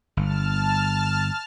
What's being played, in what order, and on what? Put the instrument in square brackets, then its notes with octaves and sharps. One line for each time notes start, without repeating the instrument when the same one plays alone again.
[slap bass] G1 [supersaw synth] A5 F6